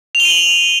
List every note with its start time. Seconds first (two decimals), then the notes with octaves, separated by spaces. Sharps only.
0.15 F7
0.20 G7
0.25 D#7
0.30 F#7